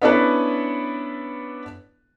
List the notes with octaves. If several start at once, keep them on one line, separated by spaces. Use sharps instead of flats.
B3 C#4 D4 E4 A4 B4